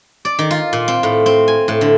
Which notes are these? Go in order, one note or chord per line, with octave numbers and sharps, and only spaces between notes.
D5
D#3
F4
A#2
C4
A2
C4
G#5
A2
D3